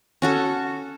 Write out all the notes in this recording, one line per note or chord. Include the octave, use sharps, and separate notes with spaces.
C#4 F#4 A4